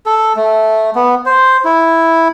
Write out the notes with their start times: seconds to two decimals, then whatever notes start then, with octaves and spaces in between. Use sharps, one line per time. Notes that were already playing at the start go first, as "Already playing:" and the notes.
0.06 A4
0.36 A3
0.95 B3
1.26 C5
1.65 E4